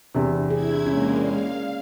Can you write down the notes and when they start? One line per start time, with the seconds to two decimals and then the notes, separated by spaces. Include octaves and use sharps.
0.15 E2 C3 D4
0.50 E4 G#4 G#6
0.87 G#3 A#3 C#4
1.21 D5 F5